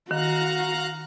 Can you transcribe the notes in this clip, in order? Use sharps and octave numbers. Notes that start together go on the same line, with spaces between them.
D#3 F#4 F5 A#5 F#6